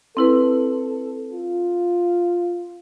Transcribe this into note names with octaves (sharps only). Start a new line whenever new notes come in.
C4 E4 A4 B4
F4